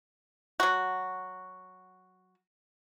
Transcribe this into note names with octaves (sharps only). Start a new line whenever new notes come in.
F#3 F#4